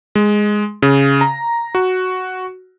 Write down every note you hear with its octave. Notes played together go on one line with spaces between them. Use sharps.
G#3
C#3
A#5
F#4